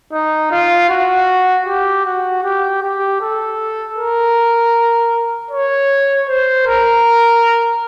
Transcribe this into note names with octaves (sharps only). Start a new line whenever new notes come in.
D#4
F4
F#4
G4
F#4
G4
G4
A4
A#4
C#5
C5
A#4